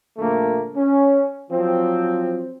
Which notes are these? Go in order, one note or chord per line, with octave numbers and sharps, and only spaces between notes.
A#1 D3 A3 A#3
C#4
F3 F#3 C4